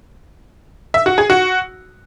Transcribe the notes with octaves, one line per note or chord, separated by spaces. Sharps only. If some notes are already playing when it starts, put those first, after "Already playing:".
E5
F#4
G#4
F#4